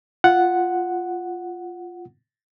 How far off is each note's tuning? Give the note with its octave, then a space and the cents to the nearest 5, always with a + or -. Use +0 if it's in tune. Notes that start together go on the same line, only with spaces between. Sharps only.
F4 +0 F#5 +0